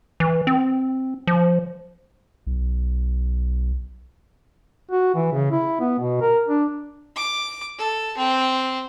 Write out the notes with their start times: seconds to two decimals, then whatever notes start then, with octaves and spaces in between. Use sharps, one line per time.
0.20 E3
0.47 C4
1.27 F3
2.47 B1
4.91 F#4
5.15 E3
5.32 C#3
5.51 E4
5.80 B3
5.99 B2
6.21 A#4
6.48 D4
7.17 D6
7.79 A4
8.18 C4